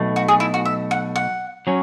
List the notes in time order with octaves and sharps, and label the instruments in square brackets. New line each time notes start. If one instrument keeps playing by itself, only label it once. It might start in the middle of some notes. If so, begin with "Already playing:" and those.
Already playing: [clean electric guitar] B1 B2 A3
[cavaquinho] F#4
G#4
E4
F#4
E5
F#5
F#5
[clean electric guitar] F#3 C#4